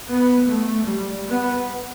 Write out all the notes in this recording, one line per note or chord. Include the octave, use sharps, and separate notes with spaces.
B3
A3
G3
B3